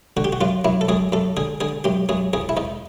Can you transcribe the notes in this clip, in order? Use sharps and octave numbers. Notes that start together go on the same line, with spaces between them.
D3 F#4
G4
F#4
F#2 F4
F#2 E4
A4
F#2 G#4
F#2 A4
D3 G#4
D3 G#4
F#2 G4
F#2 G#4
E2 G#4
E4
E2 D#4